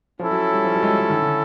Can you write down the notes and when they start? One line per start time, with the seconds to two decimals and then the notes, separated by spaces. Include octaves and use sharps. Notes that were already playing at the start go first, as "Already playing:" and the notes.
0.19 F3 C#4 E4 A4
0.31 F#3
0.53 G3
0.64 F3
0.76 F#3
0.83 G#3
0.88 G3
0.99 G#3
1.10 D#3
1.22 D3